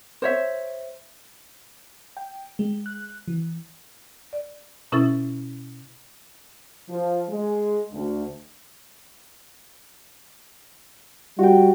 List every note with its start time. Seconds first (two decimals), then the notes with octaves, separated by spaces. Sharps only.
0.22 C5 C#5 E5
2.17 G5
2.59 G#3
2.86 F#6
3.28 E3
4.33 D5
4.92 B2 C#4 E4 A4 E5 A6
6.89 F3
7.29 G#3
7.93 D2
11.39 G3 F#4 G5